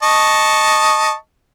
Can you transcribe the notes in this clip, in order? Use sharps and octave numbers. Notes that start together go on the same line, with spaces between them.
D#5 A5 C#6